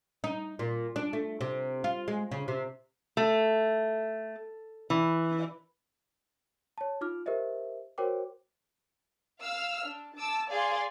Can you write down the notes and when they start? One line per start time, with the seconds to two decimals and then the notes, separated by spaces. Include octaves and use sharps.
0.24 D#4
0.59 A#2
0.96 D4
1.13 A3
1.41 C3
1.84 F4
2.08 G#3
2.31 C#3
2.48 C3
3.17 A3
4.90 E3
6.78 C#5 A5
7.01 D#4 F4 D6 F6
7.26 G4 A#4 C5 D#5 E5
7.98 F#4 A#4 C5 C#5 G5 D6
9.41 F5 E6 F6
9.84 D4
10.15 A5 D6 E6
10.50 G#4 D5 F5 G#5 C6